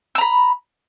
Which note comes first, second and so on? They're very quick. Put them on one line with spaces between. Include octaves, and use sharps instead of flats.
E6 A#5 B5